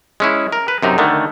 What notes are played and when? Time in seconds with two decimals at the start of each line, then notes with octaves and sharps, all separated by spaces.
0.20 G#3 C#4 E4
0.52 A#4
0.68 B4
0.83 F#2 C3 D#4
0.98 D3 D#3 A3